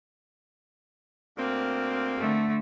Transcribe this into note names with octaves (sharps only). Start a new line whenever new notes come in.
D2 A#3 C4
D3 A3